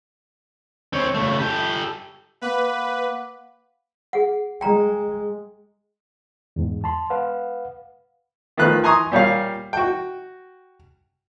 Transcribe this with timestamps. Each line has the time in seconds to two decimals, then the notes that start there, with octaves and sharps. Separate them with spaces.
0.93 C4 C#5
1.14 C#3 A3
1.39 G4 A4
2.42 A#3 B4 F5 F#5 D6
4.13 G#4 F#5
4.61 G#3 G5 A#5
6.56 E2 G#2
6.84 A5 C6
7.10 B4 F5 F#5
8.57 D#3 F3 A3 F4 B4 F#6
8.84 G#5 A#5 C6 C#6 D#6
9.12 A#2 G3 C#5 F5
9.73 F#4 G5